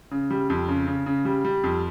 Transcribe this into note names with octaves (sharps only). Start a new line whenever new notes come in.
C#3
G3
F2
C#3
C#3
C#3
G3
G3
F2